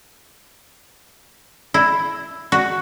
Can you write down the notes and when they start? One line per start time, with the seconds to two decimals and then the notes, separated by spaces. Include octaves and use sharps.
1.74 E4
2.52 F#4